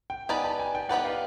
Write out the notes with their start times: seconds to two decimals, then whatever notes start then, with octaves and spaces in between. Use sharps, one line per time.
0.10 G5
0.29 B3 D#4 G4 B4 D5 G#5
0.44 A5
0.60 G#5
0.75 G5
0.89 B3 D#4 G4 B4 D5 F#5
1.05 F5